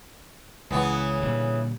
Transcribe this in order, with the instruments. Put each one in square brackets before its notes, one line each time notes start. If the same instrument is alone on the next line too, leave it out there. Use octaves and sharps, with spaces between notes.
[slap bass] C#2 [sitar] C#3 E3 B3
[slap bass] A#2 D3 G3